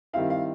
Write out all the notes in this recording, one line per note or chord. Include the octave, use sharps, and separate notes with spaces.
D#3 G3 C4 E4 F5
F5